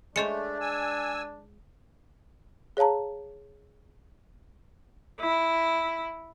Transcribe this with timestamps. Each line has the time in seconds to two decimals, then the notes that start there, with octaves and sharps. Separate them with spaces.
0.16 G#3 A3 D4 C5 C#5 D#5 C#7
0.61 G#5 E6
2.77 G#4 C#5 F5 A5 A#5
5.20 E4